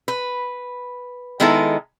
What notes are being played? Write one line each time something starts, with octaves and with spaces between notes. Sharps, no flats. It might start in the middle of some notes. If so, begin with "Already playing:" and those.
B4
D#3 G#3 B3 D#4 E4 A4